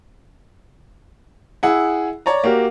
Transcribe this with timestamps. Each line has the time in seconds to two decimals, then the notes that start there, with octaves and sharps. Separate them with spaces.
1.63 E4 G#4 F#5
2.26 C#5 D5 A#5
2.44 A#3 F#4 G4 A#4